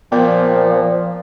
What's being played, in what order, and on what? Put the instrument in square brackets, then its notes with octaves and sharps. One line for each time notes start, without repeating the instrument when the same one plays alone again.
[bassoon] A#2 [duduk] F3 [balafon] B3 [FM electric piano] D5 G5